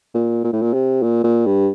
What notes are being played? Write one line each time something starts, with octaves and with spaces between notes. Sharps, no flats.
A#2
A#2
A2
A#2
C3
A#2
A#2
G2